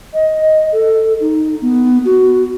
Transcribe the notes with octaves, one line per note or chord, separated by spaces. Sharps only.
D#5
A4
D#4
B3
F#4